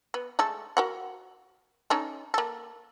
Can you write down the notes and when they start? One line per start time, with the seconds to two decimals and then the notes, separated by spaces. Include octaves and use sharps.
0.14 B3
0.39 G#3 A3 A4
0.77 F#4 A#4 F#5
1.90 C#4 D#4 A4
2.34 A#3 A4